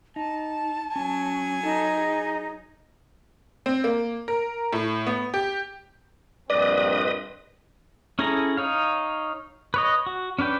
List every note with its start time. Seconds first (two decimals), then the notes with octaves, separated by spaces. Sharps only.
0.16 D#4 A5
0.96 F#3 C#4 G#5
1.63 D#4 A4 A5
1.98 G#4
3.66 C4
3.84 A#3
4.28 A#4
4.73 A2
5.07 B3
5.34 G4
6.50 A#1 G2 C4 B4 D5 D#5 D#6
8.19 C#4 E4 G#4 A4 A#5
8.57 D#4 C#5 F5
9.74 B4 C#5 D#5
10.06 F#4
10.39 C#4 D4 B4 G5